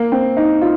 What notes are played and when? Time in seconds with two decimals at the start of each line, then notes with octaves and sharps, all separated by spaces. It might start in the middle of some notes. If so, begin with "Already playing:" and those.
Already playing: A#3
0.12 C4
0.37 D#4
0.61 F4